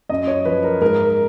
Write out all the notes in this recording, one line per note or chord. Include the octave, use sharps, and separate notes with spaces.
F#2 D#5
C#5
F3 B4
A#4
G#2 A#4